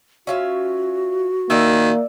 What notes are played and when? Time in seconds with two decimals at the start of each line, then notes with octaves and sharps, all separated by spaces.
0.27 C#4 F4 F#4 E5
1.50 D#3 A#3 D5 E5